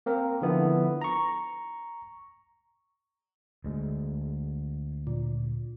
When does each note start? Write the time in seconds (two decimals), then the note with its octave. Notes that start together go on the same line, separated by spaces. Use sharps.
0.06 A#3 C4 A#4
0.42 D3 F3 B3 E4
1.01 A#5 C#6
3.64 D2 G#3
5.07 A#2